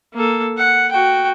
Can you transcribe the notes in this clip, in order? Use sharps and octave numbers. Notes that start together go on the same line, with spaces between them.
A#3 A4
F#5
F#4 G5